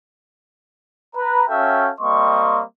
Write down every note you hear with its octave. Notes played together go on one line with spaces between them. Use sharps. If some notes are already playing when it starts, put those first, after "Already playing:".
B4 A#5
C#4 F#4 A4 E5 F5 G5
G3 A#3 C4 D#5 C6 C#6